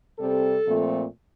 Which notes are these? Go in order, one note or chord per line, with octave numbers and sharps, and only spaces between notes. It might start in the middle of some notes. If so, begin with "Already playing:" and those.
C3 G3 C4 A4
A#2 F3 A3 C4